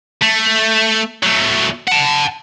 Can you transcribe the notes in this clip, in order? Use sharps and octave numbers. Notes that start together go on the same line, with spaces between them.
A3
F#3 A3
F#5 A5